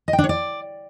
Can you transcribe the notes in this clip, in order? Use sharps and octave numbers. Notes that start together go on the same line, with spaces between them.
D#5
G5
D4
C#5
D5